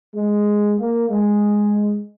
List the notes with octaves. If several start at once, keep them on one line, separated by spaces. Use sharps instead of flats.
G#3
A#3
G#3